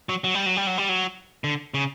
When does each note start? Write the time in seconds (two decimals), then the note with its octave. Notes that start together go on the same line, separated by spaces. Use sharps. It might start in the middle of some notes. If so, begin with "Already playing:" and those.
0.09 F#3
0.24 F#3
0.35 G3
0.46 F#3
0.57 G3
0.67 F#3
0.78 G3
0.89 F#3
1.44 D3
1.74 C#3